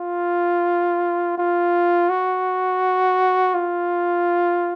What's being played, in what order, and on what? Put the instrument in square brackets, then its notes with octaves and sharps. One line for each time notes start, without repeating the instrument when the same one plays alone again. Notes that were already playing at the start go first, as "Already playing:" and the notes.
Already playing: [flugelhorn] F4
F4
F#4
F4